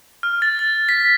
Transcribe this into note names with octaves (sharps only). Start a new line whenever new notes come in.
F6
A6
A6
B6